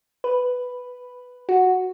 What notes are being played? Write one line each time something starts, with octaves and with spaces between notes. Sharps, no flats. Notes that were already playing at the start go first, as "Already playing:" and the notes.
B4
F#4